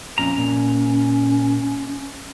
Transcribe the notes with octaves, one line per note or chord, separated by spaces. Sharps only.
F2 A#2 C#4 A#5
A#2